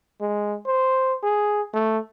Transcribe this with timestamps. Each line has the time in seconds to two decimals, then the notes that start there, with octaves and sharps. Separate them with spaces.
0.21 G#3
0.66 C5
1.23 G#4
1.74 A3